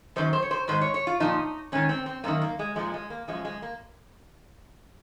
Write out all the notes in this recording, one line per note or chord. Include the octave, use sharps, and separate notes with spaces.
F#2 D#3 C5
C5
C#5
C5
G#2 D#3 C5
C#5
C#5
F4
A#2 F3 D#4
G#2 D#3 C#4
C4
C4
F#2 D#3 A#3
A#3
G#3
A#2 F3 G#3
G#3
A#3
F#2 F3 G#3
G#3
A#3